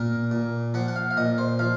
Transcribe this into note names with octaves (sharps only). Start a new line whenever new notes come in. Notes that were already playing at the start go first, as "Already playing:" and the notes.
Already playing: A#2 A#4
A#2
F3 F#5
F#5
F5
F5
A#2 D#5
C5
F3 F5